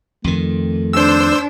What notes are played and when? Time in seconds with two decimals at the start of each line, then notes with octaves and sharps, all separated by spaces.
0.24 F2 D#3 A3
0.93 D4 C5 E6